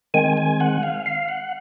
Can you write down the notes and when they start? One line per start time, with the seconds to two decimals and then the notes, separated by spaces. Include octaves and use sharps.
0.14 D#3 G#3 C4 G#5
0.37 G#5
0.60 F#5
0.83 F5
1.06 F5
1.29 F#5